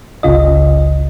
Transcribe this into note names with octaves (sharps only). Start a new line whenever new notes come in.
G1 C#2 C#3 F4 D#5